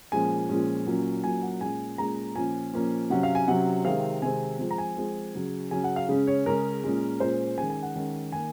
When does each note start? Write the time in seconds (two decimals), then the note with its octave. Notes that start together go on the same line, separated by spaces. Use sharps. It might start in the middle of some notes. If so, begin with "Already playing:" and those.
0.12 A#2 F3 G#3 C#4 G#5
0.49 A#2 F3 G#3 C#4
0.87 A#2 F#3 A#3 C#4
1.24 A#2 F#3 A#3 C#4 G#5
1.42 F#5
1.61 A#2 G#3 C#4 G#5
1.98 A#2 G#3 C#4 A#5
2.36 A#2 F3 A#3 C#4 G#5
2.73 A#2 F3 A#3 C#4
3.10 C3 F#3 C#4 F#5
3.23 F5
3.35 G#5
3.48 C3 F#3 C#4 F#5
3.85 C3 D#3 G#3 C4 F5
4.22 C3 D#3 G#3 C4 G#5
4.59 F3 G#3 C4
4.71 A#5
4.78 G#5
4.97 F3 G#3 C4
5.35 C#3 F#3 C#4
5.71 C#3 F#3 C#4 G#5
5.84 F#5
5.96 F5
6.09 C#3 G#3 C#4
6.27 C#5
6.46 C#3 G#3 C#4 A#4
6.84 A#2 G#3 C#4
7.20 A#2 G#3 C#4 C5
7.58 D#3 G#3 C#4 G#5
7.70 G#5
7.83 F#5
7.95 D#3 G#3 C#4
8.32 D#3 A#3 G#5